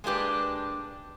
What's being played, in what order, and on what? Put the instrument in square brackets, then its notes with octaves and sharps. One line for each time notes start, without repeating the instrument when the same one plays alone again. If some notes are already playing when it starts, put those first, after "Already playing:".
[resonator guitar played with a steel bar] G#3 A#3 D4 G4 B4